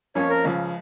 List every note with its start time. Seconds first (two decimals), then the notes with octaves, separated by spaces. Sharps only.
0.15 F2 F3 A#3 C#4 F4 C#5
0.30 A#4
0.44 C#2 C#3 F3